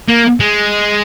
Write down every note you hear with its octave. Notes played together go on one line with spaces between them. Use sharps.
A#3
G#3